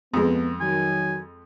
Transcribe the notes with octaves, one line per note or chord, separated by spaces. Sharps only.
F2 G#3 B3
D#3 F#3 G#5